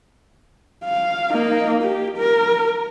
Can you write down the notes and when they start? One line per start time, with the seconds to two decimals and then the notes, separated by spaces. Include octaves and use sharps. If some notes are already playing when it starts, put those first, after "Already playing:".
0.84 F5
1.33 A#3 D#4
1.83 G4
2.17 A#4